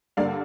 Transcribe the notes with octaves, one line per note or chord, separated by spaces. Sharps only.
G2 D3 G3 A#3 D5 F5